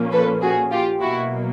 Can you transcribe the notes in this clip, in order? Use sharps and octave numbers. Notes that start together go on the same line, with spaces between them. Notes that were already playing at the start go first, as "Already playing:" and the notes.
Already playing: A#2 F3 A#3 C#4
A4 B4
F#4 G#4
F4 G4
B2 F#3 A#3 E4 F#4